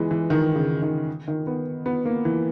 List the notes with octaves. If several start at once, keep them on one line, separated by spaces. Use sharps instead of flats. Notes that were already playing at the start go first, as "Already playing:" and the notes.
Already playing: E3 G#3 B3
E3
D#3
C#3
D#3
D#3
B3
B3
A#3
E3